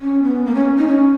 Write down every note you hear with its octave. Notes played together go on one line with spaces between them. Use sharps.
C#4
B3
A#3
C#4
D#4
C#4